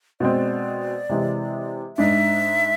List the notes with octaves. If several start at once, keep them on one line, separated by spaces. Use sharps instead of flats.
B2 G#3 C4 D5
C3 E3 G#3 C4
G#2 G#3 D4 E5